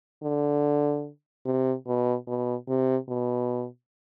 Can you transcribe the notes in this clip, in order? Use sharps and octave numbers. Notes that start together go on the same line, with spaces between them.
D3
C3
B2
B2
C3
B2